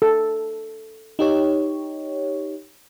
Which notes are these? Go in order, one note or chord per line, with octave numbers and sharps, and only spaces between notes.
A4
D#4 G4 C#5